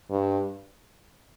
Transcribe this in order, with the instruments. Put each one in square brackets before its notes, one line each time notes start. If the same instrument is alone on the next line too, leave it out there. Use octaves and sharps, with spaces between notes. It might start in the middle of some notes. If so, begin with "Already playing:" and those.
[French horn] G2